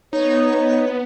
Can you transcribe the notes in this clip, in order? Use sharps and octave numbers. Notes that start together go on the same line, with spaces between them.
B3 D#4 C#5